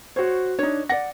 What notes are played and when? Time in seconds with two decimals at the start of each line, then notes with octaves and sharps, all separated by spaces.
0.16 F#4 C5 C#5
0.59 D4 D#4 C#5
0.89 D5 F#5 A#6